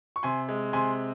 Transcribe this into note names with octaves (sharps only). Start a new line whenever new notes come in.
C#6
C3 G#5 C6
G#3
C3 G#5 C6